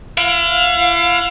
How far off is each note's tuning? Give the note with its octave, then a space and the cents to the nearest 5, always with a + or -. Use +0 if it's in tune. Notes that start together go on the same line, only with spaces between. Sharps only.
E4 +45 F5 +25